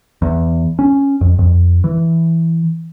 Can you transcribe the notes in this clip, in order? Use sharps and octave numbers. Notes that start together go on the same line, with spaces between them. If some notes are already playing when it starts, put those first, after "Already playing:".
E2
C#4
F2
F2
E3